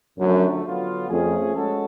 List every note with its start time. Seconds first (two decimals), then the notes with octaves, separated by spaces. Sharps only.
0.18 F#2 D3 F3 A3 D4
0.64 D3 F#3 B3 F4
1.10 F2 F3 A3 C#4 G#4
1.55 G#3 C#4 F#4 A4